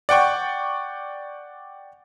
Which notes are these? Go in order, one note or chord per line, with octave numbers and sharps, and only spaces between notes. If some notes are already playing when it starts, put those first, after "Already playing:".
D5 F#5 G5 C#6